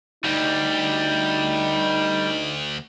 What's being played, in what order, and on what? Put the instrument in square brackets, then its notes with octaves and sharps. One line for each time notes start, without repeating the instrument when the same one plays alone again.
[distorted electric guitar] D2 [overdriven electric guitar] G3 [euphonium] D#4